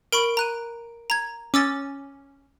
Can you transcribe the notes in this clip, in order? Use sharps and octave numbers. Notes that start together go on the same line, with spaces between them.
A#4 B5 C#6 D7
A#5 F#6 D#7
A#5 G#6
C#4 D6 E6 A6